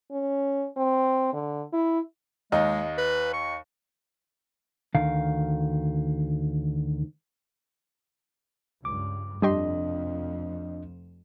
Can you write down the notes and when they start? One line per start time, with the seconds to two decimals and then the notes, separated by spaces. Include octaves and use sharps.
0.11 C#4
0.77 C4
1.33 D3
1.73 E4
2.52 D#2 G#3 D#4
2.98 B4
3.34 C#6
4.95 D2 D#3 F5
8.85 C#2 G2 D6
9.42 F1 F2 F3 G3 D4 G4 D#5 C6